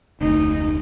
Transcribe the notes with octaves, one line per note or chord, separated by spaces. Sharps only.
F1 D2 D#4